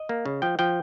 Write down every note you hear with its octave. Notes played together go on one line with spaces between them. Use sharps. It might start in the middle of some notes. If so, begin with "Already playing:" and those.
Already playing: D#5
A#3
C#3
F3 G5
F3 G5